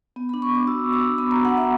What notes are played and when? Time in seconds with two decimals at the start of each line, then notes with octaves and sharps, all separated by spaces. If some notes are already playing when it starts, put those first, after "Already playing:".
0.16 B3
0.29 D4 B5
0.42 C#6
0.50 B3 D6
0.67 F#4 E6
0.84 B3
0.93 D6
1.01 D4
1.18 B3 B5
1.31 F#4 A#5
1.45 F#5
1.53 B3 E5